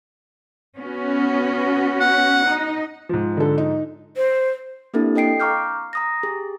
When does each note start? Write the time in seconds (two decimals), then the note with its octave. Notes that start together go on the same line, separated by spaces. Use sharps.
0.77 B3 C#4 F#4
2.00 F#5
2.45 D#4
3.09 G#2 F3
3.37 D3 A4
3.58 D#4
4.16 C5
4.94 A#3 C4 D4 E4 G4 A4
5.15 A4 D#5 G5 C7 D7
5.40 F5 A#5 C#6 D6 F6 G6
5.93 A#5 D#6 A#6
6.23 G4 G#4